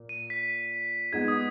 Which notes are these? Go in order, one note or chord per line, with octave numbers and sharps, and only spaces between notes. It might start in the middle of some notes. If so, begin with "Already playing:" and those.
Already playing: A#2 A#3
D#7
B6
G#3 B3 D#4 G#4 G#6
D#6